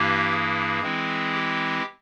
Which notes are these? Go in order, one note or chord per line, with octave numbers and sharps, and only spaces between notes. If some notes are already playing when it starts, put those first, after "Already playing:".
Already playing: G2 E3 A#3 E4 G4
G#4
E3 G#3 C4 E4
G4